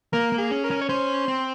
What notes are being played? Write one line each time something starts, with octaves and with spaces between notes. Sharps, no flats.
A#3 A#4
A#3
G#4
C#4
A#4
C#4
C#5
C#4 C5
C4